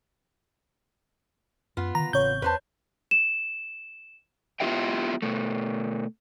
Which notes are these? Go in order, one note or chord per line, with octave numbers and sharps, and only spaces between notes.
F#2 B3 F4
D3 D#3 A#5
A1 C#3 C4 C#5 G6
E2 B4 C5 A5
E7
B3 E4 F4 G4 E5 G5
B2 A3